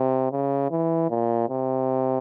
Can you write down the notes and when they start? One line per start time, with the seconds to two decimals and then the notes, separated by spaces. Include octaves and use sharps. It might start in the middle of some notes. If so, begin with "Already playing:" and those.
Already playing: C3
0.31 C#3
0.71 E3
1.10 A#2
1.50 C3